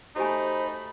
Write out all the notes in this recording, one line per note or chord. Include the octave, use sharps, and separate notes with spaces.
A3 D#4 F#4 G4 C5 G#5 B5